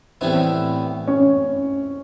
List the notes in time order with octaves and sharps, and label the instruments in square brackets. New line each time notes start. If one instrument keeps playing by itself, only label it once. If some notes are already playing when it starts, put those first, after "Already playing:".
[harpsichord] A2 E3 G3 B3 E4 [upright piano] C4
[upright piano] C#4